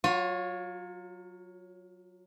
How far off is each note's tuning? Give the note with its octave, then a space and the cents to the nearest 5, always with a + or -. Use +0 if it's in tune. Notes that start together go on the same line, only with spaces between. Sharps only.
F#3 -5 F4 +30 C#5 +0